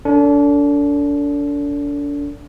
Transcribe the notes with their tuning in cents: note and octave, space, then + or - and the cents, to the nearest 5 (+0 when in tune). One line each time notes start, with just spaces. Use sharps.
D4 -35 A4 +30